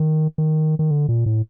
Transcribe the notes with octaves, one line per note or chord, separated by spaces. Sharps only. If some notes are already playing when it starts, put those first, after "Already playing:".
Already playing: D#3
D#3
D#3
D3
A#2
A2